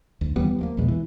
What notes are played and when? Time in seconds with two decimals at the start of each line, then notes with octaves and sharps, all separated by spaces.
0.21 D2
0.36 D#2 E3 G3 B3
0.59 F3 A3 A#3
0.77 A#1 E2 B2 G#3
0.88 E3